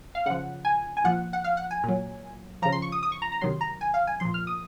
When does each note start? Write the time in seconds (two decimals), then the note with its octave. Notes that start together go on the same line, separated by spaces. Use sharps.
0.15 F5
0.26 C#3 F3 F#5
0.65 G#5
0.97 G#5
1.04 A#2 F3 F#5
1.33 F#5
1.44 F5
1.57 F#5
1.71 G#5
1.83 A#2 F#3
2.62 F3 A#5
2.65 C#3
2.72 C6
2.82 C#6
2.92 D#6
3.03 D#6
3.12 C#6
3.22 A#5
3.32 A#5
3.41 C3 D#3 F#3 C6
3.61 A#5
3.81 G#5
3.94 F5
4.07 G#5
4.20 A#2 F3 C6
4.34 F6
4.47 D#6